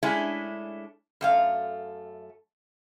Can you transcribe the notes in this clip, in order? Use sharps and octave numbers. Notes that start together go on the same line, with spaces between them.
G#3 A3 C#4 D4 E4
F#2 A3 F5